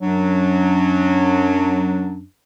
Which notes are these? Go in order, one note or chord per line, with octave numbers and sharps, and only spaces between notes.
F#2 F#3 D4